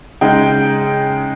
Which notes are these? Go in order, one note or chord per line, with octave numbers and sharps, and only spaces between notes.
C#3 G#3 D#4 G5